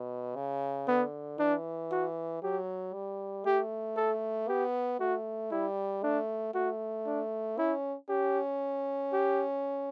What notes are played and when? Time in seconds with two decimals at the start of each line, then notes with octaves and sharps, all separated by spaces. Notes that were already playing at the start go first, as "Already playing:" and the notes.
Already playing: B2
0.36 C#3
0.88 D3 B3
1.39 E3 D4
1.91 F#4
2.42 F#3 G4
2.94 G3
3.45 A3 G4
3.97 A4
4.49 B3 G4
5.00 A3 F#4
5.51 G3 E4
6.03 A3 D4
6.54 A3 F#4
7.06 D4
7.58 C#4 E4
8.09 C#4 G4
9.13 G4